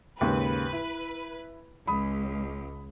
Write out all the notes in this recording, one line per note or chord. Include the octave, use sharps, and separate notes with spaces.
D#2 G#2 C#3 B4
E4
C#2 B5 D#6